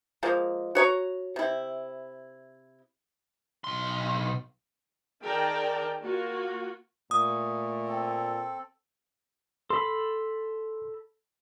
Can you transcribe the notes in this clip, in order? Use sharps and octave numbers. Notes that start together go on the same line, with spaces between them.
F3 G#3 A#3
F#4 C#5 A#5
C3 E4
B1 C6
D#3 G#4 A#4 D5 G5 A5
A#3 F4 F#4
A#2 A3 D#6
C4 A4
A4 B5 C6